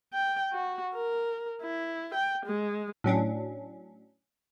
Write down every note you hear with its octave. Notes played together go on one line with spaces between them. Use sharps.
G5
F#4
A#4
E4
G5
G#3
A2 F#3 C#4 D4